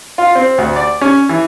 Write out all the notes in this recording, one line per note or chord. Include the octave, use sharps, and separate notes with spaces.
F4
C4
D2
D5
C#4
E3